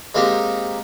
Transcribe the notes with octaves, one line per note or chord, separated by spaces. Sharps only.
G#3 A#3 C4 D#4 G4